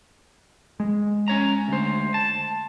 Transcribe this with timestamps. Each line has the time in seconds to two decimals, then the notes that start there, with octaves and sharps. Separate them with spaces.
0.80 G#3
1.28 C#4 C#5 A#5
1.68 D2 C5
2.14 A5